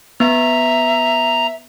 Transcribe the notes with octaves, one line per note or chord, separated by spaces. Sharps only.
B3 E5 A#5